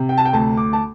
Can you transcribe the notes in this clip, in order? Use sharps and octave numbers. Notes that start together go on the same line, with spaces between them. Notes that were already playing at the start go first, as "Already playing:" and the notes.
Already playing: C3
G5
A5
G5
D2 A5
D6
A5